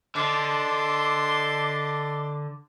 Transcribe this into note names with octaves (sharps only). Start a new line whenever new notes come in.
D3 D#5 A5 C6 D6